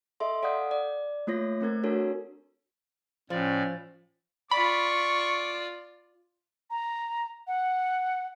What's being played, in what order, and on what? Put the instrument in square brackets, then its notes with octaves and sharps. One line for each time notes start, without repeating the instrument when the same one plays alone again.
[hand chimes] A4 D#5 E5 C6
A4 D5 F5 F#5 D#6 G6
D5
A3 A#3 F4 C#5 A#6
A3 C4 A#4 G#6
D4 F#4 A4 A#4 C#5
[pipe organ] A2 D5 [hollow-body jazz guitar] F3 [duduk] C#4
[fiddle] F4 D5 [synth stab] B5 [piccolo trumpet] C#6
[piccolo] A#5
F#5